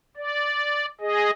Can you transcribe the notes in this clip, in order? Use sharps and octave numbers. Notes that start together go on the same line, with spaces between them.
D5
G#4 D#5